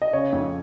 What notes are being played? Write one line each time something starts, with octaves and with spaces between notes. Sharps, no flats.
D#5
C#3 C#5
F2